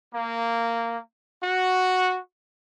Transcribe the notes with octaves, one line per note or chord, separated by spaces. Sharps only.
A#3
F#4